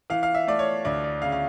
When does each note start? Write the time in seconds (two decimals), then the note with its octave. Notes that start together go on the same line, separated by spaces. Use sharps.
0.10 E3 F5
0.23 F5
0.34 E5
0.47 A3 D5
0.59 C#5
0.85 D2 D5
1.04 D5
1.22 C#3 F5
1.32 F5